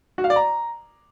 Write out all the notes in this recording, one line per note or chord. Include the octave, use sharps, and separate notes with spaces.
F#4
F5
D5
A#5